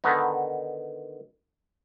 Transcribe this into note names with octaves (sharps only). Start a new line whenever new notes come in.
D3 D#3 B3 D#4